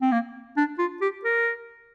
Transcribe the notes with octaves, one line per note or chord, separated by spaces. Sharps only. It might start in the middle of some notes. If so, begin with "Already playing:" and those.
C4
A#3
D4
F4
G4
A#4